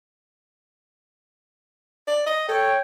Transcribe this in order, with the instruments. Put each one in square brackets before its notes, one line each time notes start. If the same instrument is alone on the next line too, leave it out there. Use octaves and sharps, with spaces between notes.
[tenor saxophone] D5
D#5
[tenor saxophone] A4 [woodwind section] C#5 G5